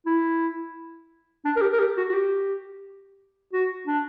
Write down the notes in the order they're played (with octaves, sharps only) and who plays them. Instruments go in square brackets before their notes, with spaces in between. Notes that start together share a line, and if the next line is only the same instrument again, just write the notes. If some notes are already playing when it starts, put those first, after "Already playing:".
[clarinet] E4
D4
A#4
G4
A#4
G4
F#4
F#4
G4
F#4
D4